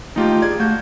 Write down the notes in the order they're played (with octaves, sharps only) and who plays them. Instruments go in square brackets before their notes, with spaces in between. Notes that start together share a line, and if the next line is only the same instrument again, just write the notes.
[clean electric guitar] D#2 A3 G5 [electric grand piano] D#4 F4 G4
[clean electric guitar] G#4 [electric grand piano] D5 G#6
[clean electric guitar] A3 [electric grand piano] F#4 F5 G6